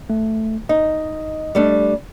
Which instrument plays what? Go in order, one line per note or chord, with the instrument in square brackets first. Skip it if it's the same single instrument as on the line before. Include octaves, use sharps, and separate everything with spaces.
[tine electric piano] A3
[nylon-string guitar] D#4 [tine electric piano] D#5
[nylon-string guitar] G3 A3 D4